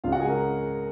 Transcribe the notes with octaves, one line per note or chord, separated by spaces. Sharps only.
C#2 C#3 G#3 F4 F5
F#4 F#5
G#4 G#5
A#4 A#5